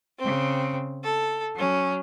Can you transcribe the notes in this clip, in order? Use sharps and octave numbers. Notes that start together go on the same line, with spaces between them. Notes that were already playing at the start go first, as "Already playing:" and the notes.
C#3 C4
A4
F#3 C#4